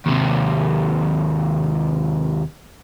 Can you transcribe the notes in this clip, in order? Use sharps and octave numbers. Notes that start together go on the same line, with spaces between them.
D#2 C3